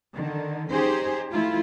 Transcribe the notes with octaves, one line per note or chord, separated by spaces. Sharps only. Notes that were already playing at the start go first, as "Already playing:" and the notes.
D3 D#3
C#4 D#4 G4 G#4 C5
F3 A3 E4 F4